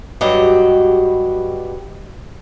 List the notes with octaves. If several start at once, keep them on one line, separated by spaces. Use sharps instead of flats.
G2 F#3 F#4 G4 D#5